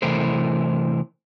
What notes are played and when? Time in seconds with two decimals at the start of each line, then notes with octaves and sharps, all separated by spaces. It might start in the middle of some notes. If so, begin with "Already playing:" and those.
0.02 C3 E3 A3 E4 A#4 C5